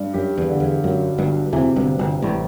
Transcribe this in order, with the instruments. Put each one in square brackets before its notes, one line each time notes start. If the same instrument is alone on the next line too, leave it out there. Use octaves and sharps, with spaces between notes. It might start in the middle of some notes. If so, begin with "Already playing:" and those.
Already playing: [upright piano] G2
[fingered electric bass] F#2 [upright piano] G4
[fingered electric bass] E2
[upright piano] D3
[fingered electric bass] E2
[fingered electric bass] F#2 [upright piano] F#3
[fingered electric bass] G1 G2 [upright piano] F#3
[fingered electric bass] E2 E3 [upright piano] C3
[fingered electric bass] G1 G2
[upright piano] C3
[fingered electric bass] G1 G2
[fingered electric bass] A1 A2 [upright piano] G3